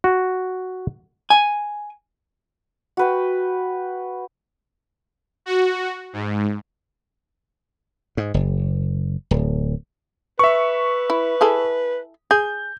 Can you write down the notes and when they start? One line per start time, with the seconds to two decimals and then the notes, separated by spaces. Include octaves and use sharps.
0.04 F#4
1.30 G#5
2.97 F#4 B4 G5
5.46 F#4
6.13 G#2
8.17 G#2
8.34 F#1
9.31 D1
10.39 B4 E5 C#6
11.10 E4
11.41 E4 G#4 A4
12.31 G#4 G6